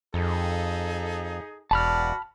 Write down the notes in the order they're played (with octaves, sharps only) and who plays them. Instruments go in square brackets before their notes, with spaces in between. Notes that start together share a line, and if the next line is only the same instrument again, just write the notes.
[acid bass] F2 [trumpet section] D#4 G#4 A4
[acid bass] E1 [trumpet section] F#4 B4 D5 [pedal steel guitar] A5 B5 F6